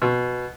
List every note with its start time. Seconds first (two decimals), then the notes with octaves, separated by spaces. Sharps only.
0.02 B2